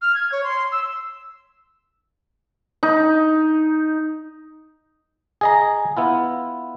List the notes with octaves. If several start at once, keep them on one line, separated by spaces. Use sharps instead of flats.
F6
G#6
C#5
C6
E6
D#4
G#4 D#5 A#5
B3 E4 F4